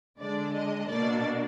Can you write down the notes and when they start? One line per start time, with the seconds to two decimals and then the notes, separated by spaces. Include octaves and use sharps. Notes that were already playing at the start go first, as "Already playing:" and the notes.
0.20 D3 G#3 D4 D5
0.55 D#5
0.88 B2 A#3 D4 D5